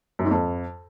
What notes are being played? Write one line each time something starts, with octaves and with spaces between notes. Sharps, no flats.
F#2
G#2
F2